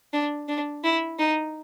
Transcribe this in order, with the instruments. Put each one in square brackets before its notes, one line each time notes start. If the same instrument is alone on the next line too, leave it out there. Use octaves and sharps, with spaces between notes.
[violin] D4
D4
E4
D#4